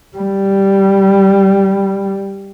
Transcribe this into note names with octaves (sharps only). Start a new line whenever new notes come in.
G3